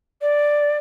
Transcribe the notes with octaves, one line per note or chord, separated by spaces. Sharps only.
D5